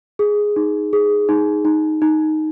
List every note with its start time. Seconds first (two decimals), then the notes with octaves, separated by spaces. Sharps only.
0.19 G#4
0.56 D#4
0.93 G#4
1.29 D#4
1.65 D#4
2.02 D#4